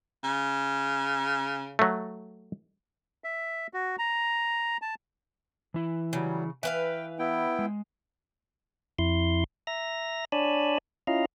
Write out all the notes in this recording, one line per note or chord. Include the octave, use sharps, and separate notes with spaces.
C#3
F#3 A3
E5
F#4
A#5
A5
E3 E4
C#3 F#3 G3
E3 B4 E5 F5 G5
B3 E4 G5
G#3
F2 E4 C6
E5 A#5 A#6
D4 C#5 D5 G#5 A5 B5
C#4 E4 F4 D#5 F5 A#5